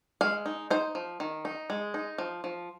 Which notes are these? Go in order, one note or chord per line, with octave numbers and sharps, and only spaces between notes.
G#3 F5
D#4
D#4 C5
F3
D#3
D#4
G#3
D#4
F3
F3